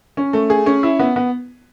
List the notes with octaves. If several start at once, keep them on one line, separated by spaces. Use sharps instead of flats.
C#4
A3
G#4
C#4
E4
B3
B3